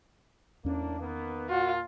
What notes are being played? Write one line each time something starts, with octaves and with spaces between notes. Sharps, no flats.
E2 A2 A#3 C#4 D4
D#3 A#3 B3
A#2 F4 F#4